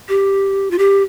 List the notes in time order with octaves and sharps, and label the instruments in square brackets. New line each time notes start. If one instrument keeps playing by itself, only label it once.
[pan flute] G4
F4
G4